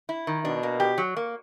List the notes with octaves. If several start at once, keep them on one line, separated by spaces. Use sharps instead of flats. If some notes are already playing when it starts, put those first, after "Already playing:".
E4
D#3
B2 D4
A#3
G4
F#3
A#3